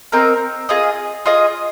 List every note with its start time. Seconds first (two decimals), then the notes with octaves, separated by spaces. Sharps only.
0.12 C4 D#4 A#4
0.69 F4 G#4 D#5
1.26 F4 G#4 D#5